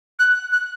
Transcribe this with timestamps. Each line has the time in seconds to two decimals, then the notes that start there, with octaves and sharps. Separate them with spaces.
0.19 F#6
0.52 F#6